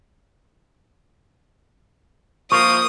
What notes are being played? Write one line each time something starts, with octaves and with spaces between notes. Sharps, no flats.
F3 A#3 F4 C#6 D#6